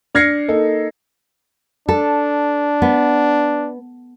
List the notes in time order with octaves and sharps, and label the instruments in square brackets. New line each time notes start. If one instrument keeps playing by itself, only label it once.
[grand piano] D4 F6 G#6 A#6 C7 C#7
A#3 D#4 A4
[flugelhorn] D4 [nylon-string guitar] A4
[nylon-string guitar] B3